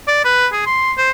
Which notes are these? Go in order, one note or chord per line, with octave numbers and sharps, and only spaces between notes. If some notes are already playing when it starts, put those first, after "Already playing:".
D5
B4
G#4
C6
C5